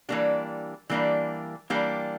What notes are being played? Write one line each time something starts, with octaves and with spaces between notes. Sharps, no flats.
E3 G3 A#3 D4 G4
E3 G3 A#3 D4 G4
E3 G3 A#3 D4 G4